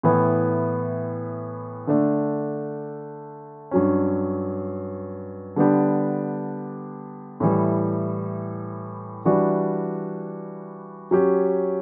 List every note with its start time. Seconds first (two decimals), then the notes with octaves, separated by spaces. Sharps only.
0.03 A2 E3 B3 E4
1.87 D3 A3 D4
3.71 G2 F#3 C#4
5.56 D3 G3 B3 D4 G4
7.40 A2 E3 G3
9.25 E3 G3 D4 F#4
11.11 F#3 C#4 G4